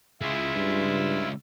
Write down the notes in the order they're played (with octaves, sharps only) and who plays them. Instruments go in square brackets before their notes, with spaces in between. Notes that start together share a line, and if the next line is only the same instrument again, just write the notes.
[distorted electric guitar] C#3 G#3 [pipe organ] E4 F4 E5
[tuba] G2